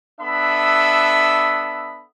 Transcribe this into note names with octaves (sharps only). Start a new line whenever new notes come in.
B3 D4 A4 E5 B5 D#6